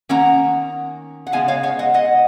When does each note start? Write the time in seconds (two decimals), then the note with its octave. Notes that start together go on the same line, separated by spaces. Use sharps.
0.09 D#3 A#3 C#4 F#5 A#5
1.27 F#5
1.32 C#3 G#3 B3 D#4 F5 G#5
1.48 C#5 F5
1.63 C#5 F5
1.79 D#5 F#5
1.94 D#5 F#5